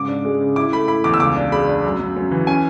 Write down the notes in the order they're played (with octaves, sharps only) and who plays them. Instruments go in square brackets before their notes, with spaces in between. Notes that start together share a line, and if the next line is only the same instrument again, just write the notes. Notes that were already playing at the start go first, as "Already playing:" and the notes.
Already playing: [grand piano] G#2 C#3 D6
D4
G#3
C#3
E4 D6
A3 B5
E4 B5
E2 D6
E6
C#2 D6
D4
G#3 B5
D4
F#2
F#2
F#2
E3
C#4 G#5